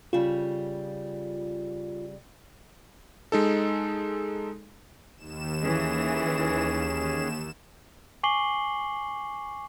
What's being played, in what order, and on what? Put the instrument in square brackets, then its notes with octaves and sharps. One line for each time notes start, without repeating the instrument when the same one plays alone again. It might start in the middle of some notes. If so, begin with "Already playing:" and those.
[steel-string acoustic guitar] C#3 G3 [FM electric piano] F4
[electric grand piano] G#3 D#4 A4
[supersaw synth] D#2 E7
[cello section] E3 [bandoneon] C#4 G#4
[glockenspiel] G#5 C#6 D6 C7 F#7 G7